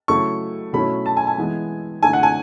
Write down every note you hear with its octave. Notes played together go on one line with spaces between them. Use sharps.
C#3 F#3 A3 E4 C#6
B2 F#3 A3 C#4 E4 B5
A5
G#5
G#5
E3 G#3 B3 E4
D3 A3 E4 G#5
F#5
G#5